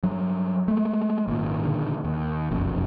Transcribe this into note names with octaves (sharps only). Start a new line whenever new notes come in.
G2 F#3
G#3 A3
G#1 A#2
A#2 D3 D#3
D#2
F1 B1 F#2